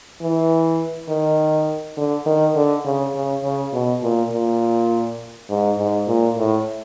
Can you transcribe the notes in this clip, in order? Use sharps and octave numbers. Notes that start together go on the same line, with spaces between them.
E3
D#3
D3
D#3
D3
C#3
C#3
C#3
B2
A#2
A#2
G#2
G#2
A#2
A2